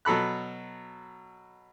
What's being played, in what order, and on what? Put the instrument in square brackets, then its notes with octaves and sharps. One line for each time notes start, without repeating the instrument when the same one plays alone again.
[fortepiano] B2 F#3 A4 B5 F#6